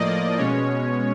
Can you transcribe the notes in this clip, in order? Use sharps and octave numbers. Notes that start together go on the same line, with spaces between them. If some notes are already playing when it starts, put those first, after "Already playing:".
Already playing: A2 F3 A#3 D5 D#5
B2 G#3 C#4 C#5